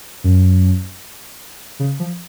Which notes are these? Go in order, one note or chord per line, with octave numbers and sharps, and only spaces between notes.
F#2
C#3
F3